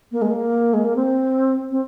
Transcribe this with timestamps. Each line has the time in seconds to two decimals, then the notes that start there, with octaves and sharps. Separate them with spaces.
0.12 A#3
0.22 G#3
0.31 A#3
0.73 G#3
0.85 A#3
0.96 C4
1.71 C4